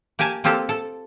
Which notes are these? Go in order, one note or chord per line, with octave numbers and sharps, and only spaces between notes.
A#3 G4 A#4 G#5 A5
A#3 C4 F4 G4 A4
A4